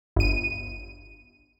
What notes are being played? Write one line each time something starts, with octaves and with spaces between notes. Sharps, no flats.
G1 D#7